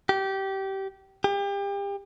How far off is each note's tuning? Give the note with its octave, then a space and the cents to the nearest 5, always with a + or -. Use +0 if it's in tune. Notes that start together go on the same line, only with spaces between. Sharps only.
G4 -20
G4 +35